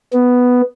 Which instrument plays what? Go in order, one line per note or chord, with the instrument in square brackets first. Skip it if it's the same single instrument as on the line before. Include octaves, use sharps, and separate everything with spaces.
[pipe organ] B3